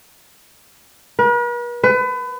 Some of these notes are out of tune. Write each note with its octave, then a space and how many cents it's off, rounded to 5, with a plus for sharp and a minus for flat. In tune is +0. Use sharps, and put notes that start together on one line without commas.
B4 -45
B4 +30